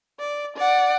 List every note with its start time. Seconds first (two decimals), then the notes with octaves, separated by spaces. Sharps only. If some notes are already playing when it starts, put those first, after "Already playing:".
0.20 D5
0.57 D5 F#5